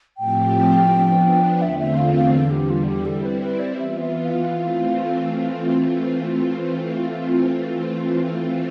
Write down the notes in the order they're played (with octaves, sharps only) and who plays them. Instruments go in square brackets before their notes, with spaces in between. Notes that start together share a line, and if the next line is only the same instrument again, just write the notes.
[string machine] A2 F3 A3 C4 G4 [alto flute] G5
[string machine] F3 B3 D4
[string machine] E2 D3 A3 C4 F4 [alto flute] E5
[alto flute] E5
F5
F5
[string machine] E2 D3 G3 [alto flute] A4
[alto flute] G4
F4
G4
[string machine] G3 C4 E4 [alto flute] A4
[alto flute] B4
B4
D5
[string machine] E3 B3 F4 [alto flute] E5
[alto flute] E5
F5
[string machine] E3 A3 C4 F4